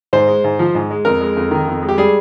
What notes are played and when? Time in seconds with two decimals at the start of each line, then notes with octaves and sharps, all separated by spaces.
0.13 G#2 C5
0.28 G#3
0.44 G#2
0.59 F3
0.75 G#2
0.91 G#3
1.05 F2 A#4
1.21 G#3
1.37 F2
1.51 D#3
1.67 F2
1.82 G#3
1.89 G4
1.98 G3 G#4